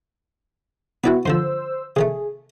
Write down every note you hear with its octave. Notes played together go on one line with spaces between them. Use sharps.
B3 E4 F#4 B4 D5 G5
G2 D3 F3 C5 E6
C3 D#3 A3 G#4